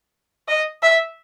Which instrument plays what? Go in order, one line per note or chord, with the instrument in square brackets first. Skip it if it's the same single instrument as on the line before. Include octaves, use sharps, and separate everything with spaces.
[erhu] D#5
E5